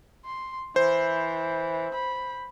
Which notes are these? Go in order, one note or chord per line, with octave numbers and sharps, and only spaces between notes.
C6
E3 C5
B5